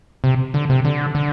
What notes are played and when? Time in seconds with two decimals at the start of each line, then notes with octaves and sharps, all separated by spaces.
0.24 C3
0.54 D3
0.70 C3
0.85 D3
1.15 D3